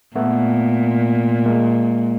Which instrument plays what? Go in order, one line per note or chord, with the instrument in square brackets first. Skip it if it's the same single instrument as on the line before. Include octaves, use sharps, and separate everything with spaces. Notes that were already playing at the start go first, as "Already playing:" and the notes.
[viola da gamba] A#2 [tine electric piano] A3 B3
[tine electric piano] G#3 A#3